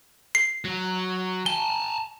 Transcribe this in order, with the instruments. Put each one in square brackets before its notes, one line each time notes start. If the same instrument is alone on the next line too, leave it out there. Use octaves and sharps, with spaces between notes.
[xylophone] C7
[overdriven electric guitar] F#3
[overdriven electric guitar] G#5 A5 [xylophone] G7